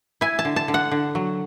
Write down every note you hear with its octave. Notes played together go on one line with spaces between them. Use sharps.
E4 G#5
A5
D3
A5
D3
F#5
D3
F#3